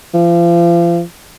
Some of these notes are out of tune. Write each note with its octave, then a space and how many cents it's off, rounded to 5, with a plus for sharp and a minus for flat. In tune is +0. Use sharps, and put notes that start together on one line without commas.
F3 -35